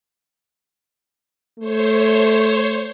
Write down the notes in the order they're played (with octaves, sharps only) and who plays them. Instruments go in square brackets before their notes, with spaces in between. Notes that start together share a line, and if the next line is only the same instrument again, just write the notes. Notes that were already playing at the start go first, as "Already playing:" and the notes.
[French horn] A3 [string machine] C5 C#5